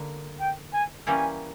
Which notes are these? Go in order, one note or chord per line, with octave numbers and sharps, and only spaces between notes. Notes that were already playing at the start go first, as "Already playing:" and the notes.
Already playing: D3 A#3 D4
G5
G#5
E3 G3 A#3 C#4 E4 G#5